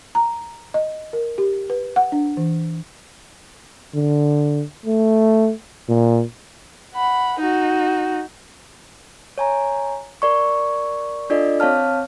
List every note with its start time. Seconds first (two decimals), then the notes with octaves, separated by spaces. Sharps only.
0.15 A#5
0.74 D#5
1.13 A#4
1.38 G4
1.70 B4
1.96 F#5
2.12 D4
2.37 E3
3.95 D3
4.86 A3
5.88 A#2
6.95 F#5 B5
7.40 D#4 F#4
9.38 C#5 G#5 A#5
10.22 A#4 D5 C#6
11.30 D4 F4 A4 D5 D#5
11.60 C4 C#5 F5 A5 F6